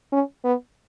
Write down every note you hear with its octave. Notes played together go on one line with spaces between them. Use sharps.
C#4
B3